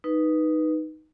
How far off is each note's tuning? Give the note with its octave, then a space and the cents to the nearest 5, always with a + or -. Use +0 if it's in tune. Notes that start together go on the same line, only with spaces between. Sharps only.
D#4 +0 B4 -5